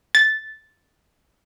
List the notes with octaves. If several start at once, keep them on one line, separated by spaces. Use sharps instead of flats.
A6